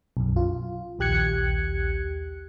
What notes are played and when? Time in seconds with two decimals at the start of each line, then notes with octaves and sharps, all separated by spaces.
0.17 B1 F#2
0.36 F4
0.99 A#1 D#2 G4 F#6 G#6 C#7